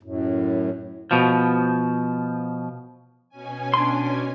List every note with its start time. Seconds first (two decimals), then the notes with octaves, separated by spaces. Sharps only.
0.03 F#2 A2
1.11 B2 F3
3.29 B2 C#4 G#5
3.74 D4 C6